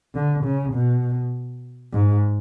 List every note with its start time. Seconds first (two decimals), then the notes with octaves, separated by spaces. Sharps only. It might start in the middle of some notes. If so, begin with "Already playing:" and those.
0.15 D3
0.45 C#3
0.73 B2
1.93 G#2